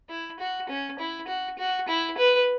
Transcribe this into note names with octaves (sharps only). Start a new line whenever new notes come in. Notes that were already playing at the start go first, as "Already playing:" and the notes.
E4
F#4
C#4
E4
F#4
F#4
E4
B4